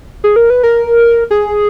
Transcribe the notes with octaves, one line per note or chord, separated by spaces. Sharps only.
G#4
A#4
B4
A#4
G#4